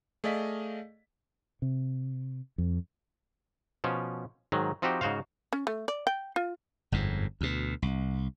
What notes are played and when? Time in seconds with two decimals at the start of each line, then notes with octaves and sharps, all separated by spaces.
0.24 A3 G#4 D5 D#5 F5 B6
1.62 C3
2.58 F2
3.84 B2 F3 C#4
4.52 G#2 D#3 F#3
4.82 F3 C4 D#4 F#4 G4
5.01 G#2 C#3 F#4 C5 F5
5.53 C#4
5.67 A3
5.88 D5
6.07 G5
6.36 F4
6.92 G1 F2 G#2
7.41 D2 B2
7.82 C2